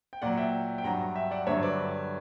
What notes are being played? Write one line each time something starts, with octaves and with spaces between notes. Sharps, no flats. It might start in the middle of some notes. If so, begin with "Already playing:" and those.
G5
A#2 F#3 D5 F#5
E5 G5
G5
G2 F#3 F#5 A#5
E5 G5
D5 F#5
G2 D3 F#3 C#5 E5
B4 D5